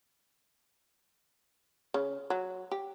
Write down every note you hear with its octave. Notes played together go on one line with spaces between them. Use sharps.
C#3
F#3
G4